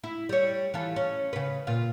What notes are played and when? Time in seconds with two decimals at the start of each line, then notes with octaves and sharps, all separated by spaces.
0.04 E4
0.29 G3 C#5
0.74 E3 F4 A4
0.96 C#4
1.33 C#3 B4
1.67 A#2 F4